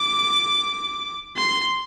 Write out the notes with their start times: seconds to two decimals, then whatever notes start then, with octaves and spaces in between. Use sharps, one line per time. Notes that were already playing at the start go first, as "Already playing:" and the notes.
Already playing: D6
1.37 C6